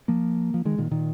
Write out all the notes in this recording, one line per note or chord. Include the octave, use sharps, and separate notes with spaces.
F3 A#3
F3
D#3 G#3
A#2 D#3
A#2 D#3